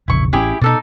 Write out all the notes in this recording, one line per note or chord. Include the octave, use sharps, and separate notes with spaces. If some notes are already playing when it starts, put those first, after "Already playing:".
E1 A#1 C#3 E4 C#6
A1 C#4 E4 G4 G#4
B2 D#4 A4 D5